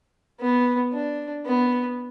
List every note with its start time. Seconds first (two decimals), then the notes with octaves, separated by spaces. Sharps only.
0.40 B3
0.93 D4
1.46 B3